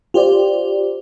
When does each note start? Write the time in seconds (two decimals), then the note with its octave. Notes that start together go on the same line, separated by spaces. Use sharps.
0.14 F4 G4 C5 D5